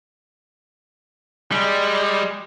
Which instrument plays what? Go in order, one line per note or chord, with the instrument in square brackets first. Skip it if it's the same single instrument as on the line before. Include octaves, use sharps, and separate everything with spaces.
[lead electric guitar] G3 [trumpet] G#3